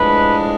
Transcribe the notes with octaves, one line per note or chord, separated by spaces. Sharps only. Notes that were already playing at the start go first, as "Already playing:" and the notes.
Already playing: A2 F3 G#3 D4 B4